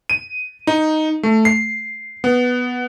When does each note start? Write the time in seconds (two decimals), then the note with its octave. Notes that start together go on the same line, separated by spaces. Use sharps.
0.10 D#7
0.67 D#4
1.23 A3
1.45 C7
2.24 B3